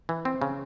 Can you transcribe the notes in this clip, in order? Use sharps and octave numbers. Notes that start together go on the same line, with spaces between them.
E3
C4
C#3